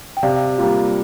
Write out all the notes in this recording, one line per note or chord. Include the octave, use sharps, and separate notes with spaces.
G5
C3 D5 F5
G3 A#3 F4